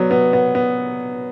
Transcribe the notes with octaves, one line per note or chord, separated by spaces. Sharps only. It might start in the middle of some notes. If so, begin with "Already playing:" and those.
Already playing: F#3 B3 C#5 D5
B3 B4
B3
B3